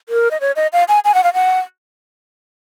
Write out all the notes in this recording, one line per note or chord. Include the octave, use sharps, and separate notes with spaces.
A#4
D#5
C#5
D#5
F5
G#5
G#5
F#5
F5
F#5